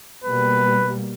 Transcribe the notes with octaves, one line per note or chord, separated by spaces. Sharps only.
B2 G3 A#3 B4